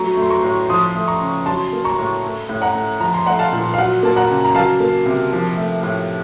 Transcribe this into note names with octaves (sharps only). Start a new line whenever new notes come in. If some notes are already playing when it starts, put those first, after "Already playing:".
Already playing: F#3 A3 A#5 C#6
A3 C6
A#5 C#6
A2
F3 C6 D#6
A3
A#5 C#6
C#3
F#3 A5 C6
A#3
A#5 C#6
A2
A3
A2
F#5 A#5
A3
F3 A#5
C6
A3 F#5 A#5
F5 A5
A#2
F5
F#3 F#5
A#3 A5
F#5 A#5
C#3
A#5
F#3 F5 A5
A#3
C3
F3
A3
A2